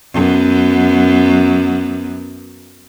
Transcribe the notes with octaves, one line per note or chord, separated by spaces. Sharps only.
F#2 B3